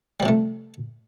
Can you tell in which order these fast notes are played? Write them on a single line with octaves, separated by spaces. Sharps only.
G3 F3 C3 A3